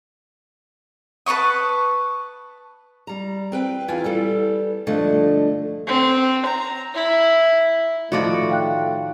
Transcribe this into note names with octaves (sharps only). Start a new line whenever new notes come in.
B4 A5 C#6 D#6
G3 A#5
C4 B4 G5
E2 E4 F4 G#5
G3 B3 A4
G2 D3 F3 A3 D4 D#5
C4
A#5
E4
A2 D#3 F3 A3 F#4 D5 B5
F5 G5 F#6